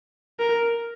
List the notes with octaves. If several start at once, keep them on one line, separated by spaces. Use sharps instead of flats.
A#4